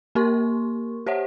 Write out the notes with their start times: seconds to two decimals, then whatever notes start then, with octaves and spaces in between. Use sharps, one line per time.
0.15 A#3 G4 A#4 C6 C#6
1.06 G4 C5 C#5 E5 F#5